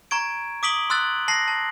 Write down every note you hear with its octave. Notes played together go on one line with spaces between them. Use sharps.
A#5 C#6 G#6 D7
D6 D#6 B6 D7 F#7 G7
C6 E6 F#6 A6 F#7
A5 A#6 C7 F#7
A5